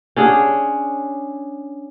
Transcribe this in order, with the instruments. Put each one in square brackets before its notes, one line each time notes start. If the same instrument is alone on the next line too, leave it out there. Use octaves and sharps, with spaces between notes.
[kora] C#4 D4 G#4 [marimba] G4 F#5